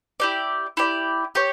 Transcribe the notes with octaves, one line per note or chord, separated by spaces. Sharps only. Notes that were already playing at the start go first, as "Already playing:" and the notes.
E4 G4 D5
E4 G4 D5
G4 C#5